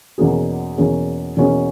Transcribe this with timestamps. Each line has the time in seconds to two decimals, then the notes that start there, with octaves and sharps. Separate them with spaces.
0.18 E2 B2 A#3 C#4 G#4
0.78 E2 B2 A#3 C#4 G#4
1.37 E2 B2 A#3 C#4 G#4